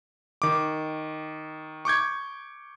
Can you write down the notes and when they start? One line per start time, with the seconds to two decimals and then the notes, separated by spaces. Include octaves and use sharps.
0.42 D#3 D6
1.85 C#6 D6 G6 G#6